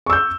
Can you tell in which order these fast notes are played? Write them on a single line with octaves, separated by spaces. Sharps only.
C#6 E6 G6